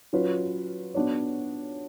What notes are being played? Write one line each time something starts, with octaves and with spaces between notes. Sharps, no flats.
F#3 C#4 F4 B4
B3 D4 F#4 C#5